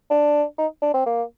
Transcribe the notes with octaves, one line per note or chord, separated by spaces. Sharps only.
D4
D#4
D4
C4
A#3